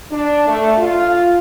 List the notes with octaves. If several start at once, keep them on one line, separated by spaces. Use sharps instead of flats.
D4
A3
F4